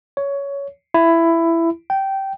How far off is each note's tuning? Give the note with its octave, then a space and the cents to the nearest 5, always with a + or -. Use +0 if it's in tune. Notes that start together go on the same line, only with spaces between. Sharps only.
C#5 +15
E4 +15
G5 -15